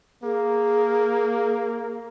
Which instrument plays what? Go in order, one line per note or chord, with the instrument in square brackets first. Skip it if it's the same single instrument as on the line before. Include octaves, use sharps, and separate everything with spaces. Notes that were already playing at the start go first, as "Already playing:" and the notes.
[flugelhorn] A#3 [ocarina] G#4